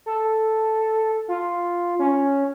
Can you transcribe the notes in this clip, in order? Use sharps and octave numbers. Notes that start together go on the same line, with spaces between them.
A4
F4
C#4